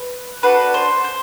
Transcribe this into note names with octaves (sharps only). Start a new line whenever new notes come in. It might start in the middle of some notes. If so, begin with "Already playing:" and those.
Already playing: B4
D4 F#4 A4 B4
C5
C5